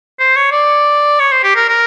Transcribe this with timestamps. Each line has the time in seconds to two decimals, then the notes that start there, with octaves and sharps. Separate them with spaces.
0.19 C5
0.36 C#5
0.52 D5
1.20 C#5
1.32 C5
1.43 G4
1.56 A#4
1.69 A#4